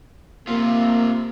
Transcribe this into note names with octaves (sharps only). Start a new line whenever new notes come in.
C3 A#3 F4